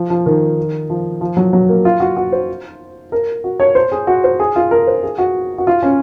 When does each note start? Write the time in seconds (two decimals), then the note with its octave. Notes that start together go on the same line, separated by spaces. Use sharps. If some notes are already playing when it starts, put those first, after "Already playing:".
Already playing: F3
0.10 F3
0.26 D#3
0.90 F3
1.21 F3
1.37 F#3
1.53 F#3
1.69 A#3
1.85 F4
2.00 F#4
2.16 F#4
2.32 C5
3.12 A#4
3.44 F#4
3.60 C#5
3.75 C5
3.92 G#4
4.07 F#4
4.24 C5
4.39 G#4
4.56 F4
4.71 A#4
4.87 C5
5.03 G#4
5.18 F#4
5.58 F#4
5.67 F4
5.83 C#4